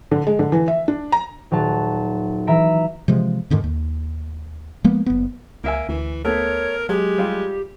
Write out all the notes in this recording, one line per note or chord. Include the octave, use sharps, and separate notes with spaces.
D3
G#3
D3
E3
E5
D4
A#5
D#1 F#3 A5
E3 E5 A#5 D7
C3 E3 F3 G#3
F2 G#2 D3 D#3
D#2
F3 G#3 A#3 B3
F#1 B3
C#2 A#3 A#4 E5 G#5
D2 E3
A3 B3 A#4 C#5
F#3 G#3 G4
G3 F4